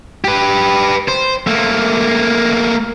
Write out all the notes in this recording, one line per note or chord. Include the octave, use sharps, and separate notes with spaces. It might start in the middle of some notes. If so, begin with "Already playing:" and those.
G4 B4
C5
A3 A#3